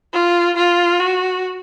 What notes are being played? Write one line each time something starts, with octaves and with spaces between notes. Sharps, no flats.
F4
F4
F#4